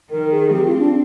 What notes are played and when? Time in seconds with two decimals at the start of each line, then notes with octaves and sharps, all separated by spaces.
0.11 D#3 A#4
0.31 G#4
0.52 C4 G4
0.66 F4
0.79 D4